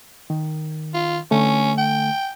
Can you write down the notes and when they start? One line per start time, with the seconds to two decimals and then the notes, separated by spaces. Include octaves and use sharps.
0.30 D#3
0.94 F4
1.31 D3 A3 C#4
1.78 G5